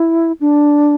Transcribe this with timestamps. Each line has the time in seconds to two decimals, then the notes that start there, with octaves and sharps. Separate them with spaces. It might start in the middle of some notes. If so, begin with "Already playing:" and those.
Already playing: E4
0.41 D4